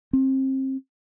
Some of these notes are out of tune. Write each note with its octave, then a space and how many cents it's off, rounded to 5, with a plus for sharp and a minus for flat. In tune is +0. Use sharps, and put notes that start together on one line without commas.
C4 +30